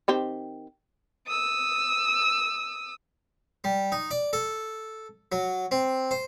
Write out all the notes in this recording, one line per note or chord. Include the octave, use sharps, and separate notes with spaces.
D#3 C4 G4
D#6 E6
G3
D#4
D5
A4
F#3
C4
C5